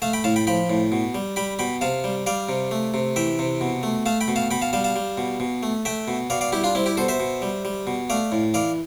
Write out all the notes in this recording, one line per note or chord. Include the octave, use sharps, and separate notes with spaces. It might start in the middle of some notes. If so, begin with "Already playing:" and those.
A3 F5 A5
G5 B5
A2 F5 A5
G5 B5
F3 G5 B5
A2
B2
G3
G3 G5 B5
B2 G5 B5
C3 F5 A5
G3
G3 D5 F5
C3
A3
C3
E3 E5 G5
C3
B2
A3
A3 F5 A5
G5 B5
B2
F5 A5
B2 G5 B5
F5 A5
G3 F5 A5
F5 A5
G3
B2
B2
A3
A3 E5 G5
B2
B2 D5 F5
D5 F5
G3 E4 G4
D4 F4
G3 C4 E4
E4 G4
B2 A4 C5
C5 E5
B2
G3
G3
B2
A3 D5 F5
A2
E3 D5 F5